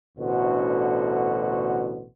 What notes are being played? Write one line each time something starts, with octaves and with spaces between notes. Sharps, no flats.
A1 D2 B2 D3 F#4 C5